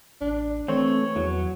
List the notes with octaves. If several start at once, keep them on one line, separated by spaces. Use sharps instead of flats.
A1 D4
E3 A3 C4 C#5
E2 F#3